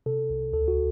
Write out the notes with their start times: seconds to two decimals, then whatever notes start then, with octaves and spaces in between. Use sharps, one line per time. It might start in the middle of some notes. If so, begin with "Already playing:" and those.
0.06 C3 A4
0.30 C2
0.53 D2 A4
0.68 F#4